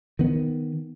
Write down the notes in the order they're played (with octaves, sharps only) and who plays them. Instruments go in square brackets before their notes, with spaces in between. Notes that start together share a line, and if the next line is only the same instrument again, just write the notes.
[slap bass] D#3 B3